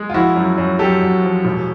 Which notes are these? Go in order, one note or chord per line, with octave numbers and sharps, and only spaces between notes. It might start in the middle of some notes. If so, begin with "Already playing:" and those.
Already playing: G#3
F4
F3 E4 F#4
F#2
F#2
F#2 G4 A4
F#2
F3
E1